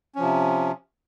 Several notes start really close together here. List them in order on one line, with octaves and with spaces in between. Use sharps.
C#4 F3 C3